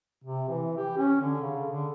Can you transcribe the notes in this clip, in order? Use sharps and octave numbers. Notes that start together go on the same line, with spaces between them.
C3
E3
G4
C#4
D3
C#3
D3